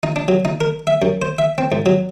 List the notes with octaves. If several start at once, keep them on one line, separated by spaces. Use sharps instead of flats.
D#4
D4
F#3
D#4
A#4
E5
F#2
C5
E5
C4
G#2
F#3